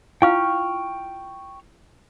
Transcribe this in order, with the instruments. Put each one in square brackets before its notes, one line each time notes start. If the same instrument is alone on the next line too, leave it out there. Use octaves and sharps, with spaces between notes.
[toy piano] E4 F4 F5 [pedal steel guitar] G5 C#6 F6